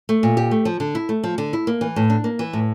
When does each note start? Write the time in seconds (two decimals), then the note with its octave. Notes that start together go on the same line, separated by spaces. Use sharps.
0.09 A3
0.23 A#2
0.37 G4
0.51 A3
0.65 F3
0.80 D3
0.95 E4
1.09 A3
1.24 F3
1.38 D3
1.53 E4
1.67 A#3
1.81 E3
1.96 A2
2.10 D4
2.24 A#3
2.39 E3
2.53 A2